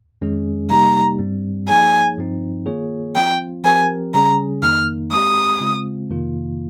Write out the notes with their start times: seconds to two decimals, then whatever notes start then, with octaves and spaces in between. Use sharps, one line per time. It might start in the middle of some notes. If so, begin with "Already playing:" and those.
0.21 F2 D#3 G#3 C#4 G#4
0.70 C3 G3 A#3 D#4 G4 A#5
1.19 G2 G3 C4
1.68 F3 A#3 D#4 G#4 C#5 G#5
2.18 G2 F3 C4 D#4
2.66 D#3 A#3 F4 G#4 C#5
3.15 F3 C4 F4 G5
3.64 F3 C4 G4 A#4 G#5
4.14 C#3 G3 C#4 G#4 A#5
4.62 F2 D#3 A#3 D#4 F6
5.11 G#3 C4 G4 D#6
5.61 C#3 G#3 C4 F4
6.10 F2 C3 D#3 A#3 F4